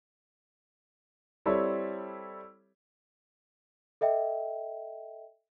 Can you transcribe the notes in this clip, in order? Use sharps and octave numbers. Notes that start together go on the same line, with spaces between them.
G3 C4 E4 A4 C#5
A4 D#5 E5 G5